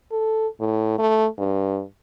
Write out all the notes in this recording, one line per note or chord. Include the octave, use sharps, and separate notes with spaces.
A4
A2
A3
G2